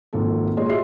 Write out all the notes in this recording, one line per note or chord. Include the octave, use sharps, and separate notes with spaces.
G#1 F2 A#3 A4
A#2 G#3 C#5 D#5 C6
F#4 G4 D#5 E5 C6 C7